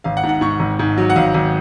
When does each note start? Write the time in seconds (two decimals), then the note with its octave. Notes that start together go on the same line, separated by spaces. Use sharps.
0.04 G#1 F5
0.17 F#5
0.24 G#2
0.29 F#5
0.41 G#2 C#6
0.60 G#1
0.79 G#2
0.98 F#3
1.10 F#5
1.16 G#1 F5
1.34 G#1